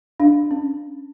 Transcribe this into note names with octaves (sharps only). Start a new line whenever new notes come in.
D4 F5
C#4